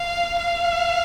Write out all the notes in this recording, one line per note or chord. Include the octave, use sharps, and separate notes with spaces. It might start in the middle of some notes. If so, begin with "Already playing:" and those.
Already playing: F5
F5